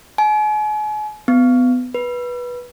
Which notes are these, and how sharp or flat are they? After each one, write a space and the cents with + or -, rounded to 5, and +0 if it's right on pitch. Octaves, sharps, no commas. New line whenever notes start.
G#5 +40
B3 +25
B4 -15